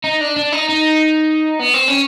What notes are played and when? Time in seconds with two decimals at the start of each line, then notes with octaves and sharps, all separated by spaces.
0.04 D#4
0.21 D4
0.37 D4
0.53 D#4
0.69 D#4
1.60 B3
1.74 C4
1.88 C#4